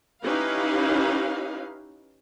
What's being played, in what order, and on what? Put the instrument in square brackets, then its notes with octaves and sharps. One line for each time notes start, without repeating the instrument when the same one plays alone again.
[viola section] C#4 D#4 E4 G4 B4 F5